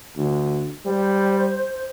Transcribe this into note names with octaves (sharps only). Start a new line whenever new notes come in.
D2
G3 C5